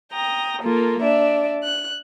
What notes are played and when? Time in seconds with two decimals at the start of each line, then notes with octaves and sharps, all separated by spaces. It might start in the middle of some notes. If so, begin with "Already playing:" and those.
0.12 G5 A#5 D#6
0.62 A#3 F4 A4 A#4
1.03 D4 D5 E5
1.63 F#6